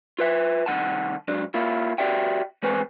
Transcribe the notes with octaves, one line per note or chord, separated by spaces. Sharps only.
F4 B4 E5
C2 D#3 F3 F#5 A5
G#2 F#3 D4
A#3 E4 F4
F#4 G4 D5 E5 G5
E3 G#3 C4 B4 G#5